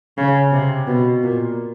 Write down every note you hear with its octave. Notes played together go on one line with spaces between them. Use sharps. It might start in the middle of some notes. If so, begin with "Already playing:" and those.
C#3
C3
B2
A#2